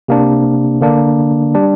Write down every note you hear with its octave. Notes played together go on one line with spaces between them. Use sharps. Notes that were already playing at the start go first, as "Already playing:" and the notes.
C3 A#3 D4
D3 A#3 D4
G3 D4